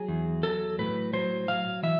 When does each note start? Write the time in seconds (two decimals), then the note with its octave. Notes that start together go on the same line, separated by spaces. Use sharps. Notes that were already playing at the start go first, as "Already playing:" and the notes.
Already playing: F#3 G#4
0.08 E2
0.43 F#3 A4
0.79 A2 B4
1.13 F#3 C5
1.48 F#3 F5
1.83 E3 E5